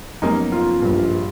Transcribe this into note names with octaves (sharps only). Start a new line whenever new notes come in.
F#2 F3 A#3 B3 C#4 D#4
F4
A#1 G2